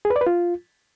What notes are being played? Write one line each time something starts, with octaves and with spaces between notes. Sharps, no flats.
G#4
B4
D5
B4
F4